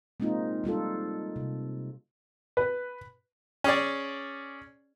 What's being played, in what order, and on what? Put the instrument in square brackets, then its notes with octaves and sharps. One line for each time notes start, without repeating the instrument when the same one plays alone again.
[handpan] G#3 A#3 C4 D#4 F4
G3 D#4 F4 A4
C3
[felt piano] B4
[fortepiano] C#4 G#4 D5